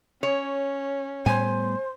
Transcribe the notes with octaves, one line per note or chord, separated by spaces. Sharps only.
C#4 C#5
A2 G3 B3 C5 G#5